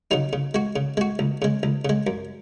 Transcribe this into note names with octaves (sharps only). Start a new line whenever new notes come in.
C#3 F#3 D#4
C#3
G#3 F#4
C#3
G#3 F#4
C#2
C#3 G#3
C#2
C#3 G#3
F#2